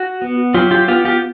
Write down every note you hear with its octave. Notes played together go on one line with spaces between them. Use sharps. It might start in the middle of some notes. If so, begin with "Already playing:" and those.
Already playing: F#4
B3
F#3 F4 G4
F4 G4
B3 F4 G4
F4 G4